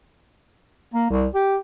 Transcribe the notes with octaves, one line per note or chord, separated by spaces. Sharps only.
A#3
C2
G4